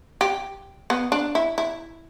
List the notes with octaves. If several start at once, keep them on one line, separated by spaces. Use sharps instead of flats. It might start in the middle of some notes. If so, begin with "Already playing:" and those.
G4
B3
D4
E4
E4